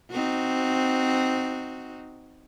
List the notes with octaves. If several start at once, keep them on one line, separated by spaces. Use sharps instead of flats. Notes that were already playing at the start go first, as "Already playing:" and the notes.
C4 D#4 F#4